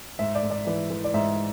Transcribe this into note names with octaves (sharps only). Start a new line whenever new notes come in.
G#2 E5
D5
G#2
D5
E3 D5
E3
D5
G#2 E5